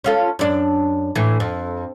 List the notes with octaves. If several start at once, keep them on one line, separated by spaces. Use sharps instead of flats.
C#4 F4 A4
F#2 D4
A2 E3
F2